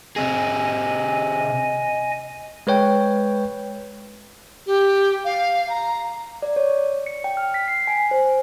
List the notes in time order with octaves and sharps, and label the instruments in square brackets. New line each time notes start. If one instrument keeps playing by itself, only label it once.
[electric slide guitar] C3 C4 G#4 [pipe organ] D#5 G#5
[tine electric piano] G#3 B4 C#5 G5
[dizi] G4
F5
A#5
[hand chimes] D5
C#5
C#7
G5
F6
B6
C7
G#5
C5